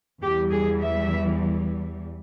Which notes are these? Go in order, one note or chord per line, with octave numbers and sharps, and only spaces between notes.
E2 E3 G3 G4
G#4
E5